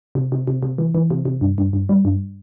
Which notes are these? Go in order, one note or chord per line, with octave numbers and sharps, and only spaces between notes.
C3
C3
C3
C3
E3
E3
C3
C3
G2
G2
G2
G3
G2